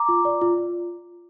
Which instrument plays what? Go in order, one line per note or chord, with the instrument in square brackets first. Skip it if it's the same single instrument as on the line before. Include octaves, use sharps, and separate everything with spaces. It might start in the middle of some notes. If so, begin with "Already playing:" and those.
Already playing: [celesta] A#5 D6
F4
D5
F4
F4